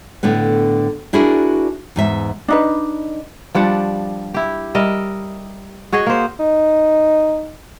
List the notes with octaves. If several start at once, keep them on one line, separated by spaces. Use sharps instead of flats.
A2 D3 A3 B3
D4 E4 F#4 G#4 A#4 D5
E2 G#2 E5
D4 D#4 B4
F3 G3 D4 F#5
E4 G4
G3 A#4 D#5 E5
F#4 G#4 C#5 D#5
A#3 C5
D#4